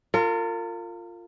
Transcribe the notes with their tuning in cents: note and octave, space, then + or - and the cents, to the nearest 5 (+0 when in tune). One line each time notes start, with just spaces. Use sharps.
F4 +0 A#4 -40